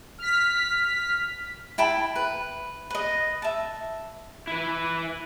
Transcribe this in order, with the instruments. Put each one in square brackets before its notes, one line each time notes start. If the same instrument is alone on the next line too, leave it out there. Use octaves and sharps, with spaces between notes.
[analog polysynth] F6 B6
[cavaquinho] E4 G5 A5 B5
B4
B4 D#5
E5 A5
[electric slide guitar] E4 B4